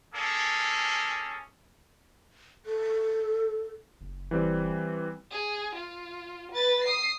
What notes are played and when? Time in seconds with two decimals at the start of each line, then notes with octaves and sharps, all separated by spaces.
0.14 A#3 C#4 G#4 A4
2.66 A4
4.01 F#1
4.31 E3 G3 C4
5.31 G#4
5.75 F4
6.51 B4 A6
6.84 D#6 C7